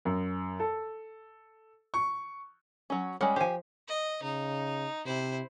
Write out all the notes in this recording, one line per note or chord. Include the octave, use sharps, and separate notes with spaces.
F#2
A4
C#6
F#3 C#4
G3 G#3 C#4 F#5
F3 G4 C5 G#5
D#5
C#3 D#4
C3 E4 C5